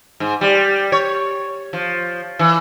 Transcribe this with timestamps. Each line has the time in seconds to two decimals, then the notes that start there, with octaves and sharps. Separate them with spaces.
0.20 G#2
0.41 G3
0.92 C#5
1.73 F3
2.39 E3